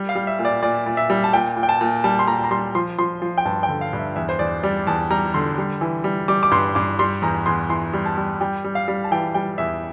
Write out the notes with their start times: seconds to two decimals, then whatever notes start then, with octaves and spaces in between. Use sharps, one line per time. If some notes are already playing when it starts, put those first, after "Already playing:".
Already playing: G3
0.09 F5
0.15 G3
0.27 E5
0.39 A#2
0.45 D5
0.62 A#2 D5
0.86 A#2
0.97 E5
1.10 G3
1.24 A5
1.33 A#2 G5
1.56 A#2
1.63 G5
1.69 A5
1.81 A#2
2.04 G3 A5
2.19 C6
2.27 A#2 A#5
2.44 A#5
2.51 G3 C6
2.75 F3 C6
2.99 F3 C6
3.22 F3
3.38 G5
3.45 G2 A5
3.63 G5
3.69 D3
3.81 F5
3.93 G2
3.99 E5
4.16 E2 E5
4.29 C5
4.39 E2 D5
4.63 G3 D5
4.87 E2 A5
5.11 G3 A#5
5.34 D3 C6
5.58 G3
5.81 E3
6.04 G3
6.28 G3 D6
6.43 D6
6.51 G2 C6
6.75 G2 D6
6.99 G3 C6
7.22 E2 A#5
7.46 E2 C6
7.69 E3 C6
7.93 G3
8.06 A5
8.17 G3
8.41 G3 G5
8.64 G3
8.75 F5
8.88 G3
9.04 A5
9.11 E3 G5
9.35 G3 G5
9.58 E2 E5